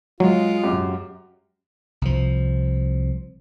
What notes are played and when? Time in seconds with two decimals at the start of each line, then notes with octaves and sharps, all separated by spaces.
0.20 F#3 G#3 F4
0.63 F#2 G4
2.02 C2 F3